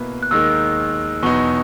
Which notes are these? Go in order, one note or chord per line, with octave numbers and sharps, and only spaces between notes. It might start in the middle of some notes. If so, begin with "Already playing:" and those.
Already playing: B2 A#3 E4 B4
F#6
D#2 D#3 G#3 D#4 A#4 E6
E2 B2 F#3 B3 D#4 C#6